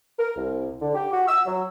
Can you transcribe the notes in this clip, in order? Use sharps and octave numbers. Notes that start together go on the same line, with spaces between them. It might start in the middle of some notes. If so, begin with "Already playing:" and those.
A#4
C2
D3
G4
F#4
E6
F#3